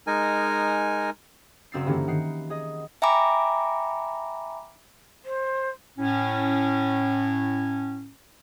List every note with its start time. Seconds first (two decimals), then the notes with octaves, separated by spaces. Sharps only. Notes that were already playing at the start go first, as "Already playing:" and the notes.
0.07 G#3 D#4 A#4 G#5
1.72 F#1 C4 E6 A6 C7
1.86 G2 D3 E3 A#3 C#4
2.07 D#3 F#5 C7
2.50 G#4 D#5
3.02 E5 G5 G#5 A#5 B5 D6
5.23 C5
5.97 A2 C#4